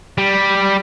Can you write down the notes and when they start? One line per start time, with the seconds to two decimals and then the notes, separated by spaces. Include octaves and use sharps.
0.18 G3